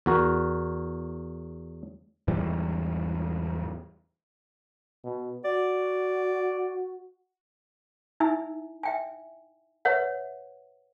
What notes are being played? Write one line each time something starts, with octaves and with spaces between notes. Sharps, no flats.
E2 F#4 A#4
E2 G#2 E3 G3
B2
F#4 D5
D#4 E4 E5 G#5 E6
E5 G5 G#5
B4 C#5 E5 F#5